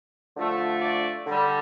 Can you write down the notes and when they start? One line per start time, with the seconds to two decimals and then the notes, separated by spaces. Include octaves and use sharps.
0.37 D3 F3 A3
0.82 D5
1.26 D3 G3